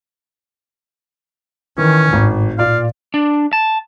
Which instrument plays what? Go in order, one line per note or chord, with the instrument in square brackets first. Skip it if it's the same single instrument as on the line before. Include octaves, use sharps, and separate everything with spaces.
[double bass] D#3 [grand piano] E3 [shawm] C#4
[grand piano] G#1 [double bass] A2
[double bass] A#2 [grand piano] F4 D5 [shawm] F5
[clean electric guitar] D4
A5